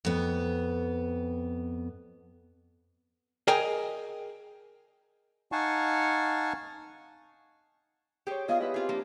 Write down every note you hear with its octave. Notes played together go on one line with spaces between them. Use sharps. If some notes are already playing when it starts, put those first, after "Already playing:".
F2 B3
G#4 A#4 D#5 G5 G#5
D#4 F5 F#5 G#5 A5 C#6
G4 G#4 C5 C#5 G5
B3 F4 G#4 D#5 F5
E4 F4 G4 B4 E5
C4 F4 G#4
F3 A#3 D4